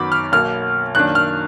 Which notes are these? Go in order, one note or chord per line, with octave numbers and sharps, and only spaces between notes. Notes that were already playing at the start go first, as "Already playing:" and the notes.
Already playing: F#2 D#3 F#3 B3 B5 D6
F6
B1 B2 A#3 F6
F#2 D#3 A#3 D4 F#6
F6